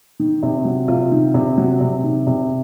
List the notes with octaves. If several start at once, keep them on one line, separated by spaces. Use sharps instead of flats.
D#3
C3
F#3
C3 F4
D#3
C3
F#3
C3
D#3
C3